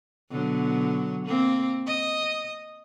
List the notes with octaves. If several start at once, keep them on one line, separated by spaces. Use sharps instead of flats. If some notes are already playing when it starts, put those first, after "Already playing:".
B2 D3 F#3
A#3 C4
D#5